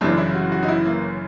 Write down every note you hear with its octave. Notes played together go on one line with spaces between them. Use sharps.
G1 F#2 C#3 E3 D4
E4
F#4
F#4
D#4
E4
A#3